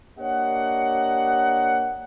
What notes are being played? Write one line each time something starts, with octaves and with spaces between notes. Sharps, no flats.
A#3 D4 G4 C#5 D#5 F#5